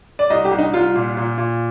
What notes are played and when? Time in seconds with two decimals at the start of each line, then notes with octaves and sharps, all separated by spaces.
0.19 D5
0.30 C2 D#5
0.45 G4
0.51 C2
0.58 D#4
0.73 C2 F4
0.95 A#2
1.17 A#2
1.38 A#2